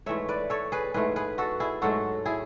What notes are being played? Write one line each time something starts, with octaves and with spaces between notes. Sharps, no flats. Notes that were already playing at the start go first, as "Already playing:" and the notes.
G#2 E3 A3 C#5 E5
B4 D5
A4 C#5
G#4 B4
G#2 E3 A3 G#4 B4
G#4 B4
F#4 A4
E4 G#4
G#2 F#3 A3 F#4 A4
E4 G#4